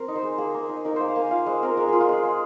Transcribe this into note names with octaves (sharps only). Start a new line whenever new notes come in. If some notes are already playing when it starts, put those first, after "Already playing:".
Already playing: C4 A#4 C6
D#4
C5
G#3
A#3 G#4
A#3
D#4
D#4 A#4
A#3 C5
F5
A#3 G#5
F4 F5
G#3 C5
C4 A#4
G#3 A#4
F4 G#4
F4
G#3 G#4
G#3